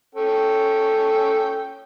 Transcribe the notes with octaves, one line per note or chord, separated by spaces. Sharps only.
C#4 A4 G5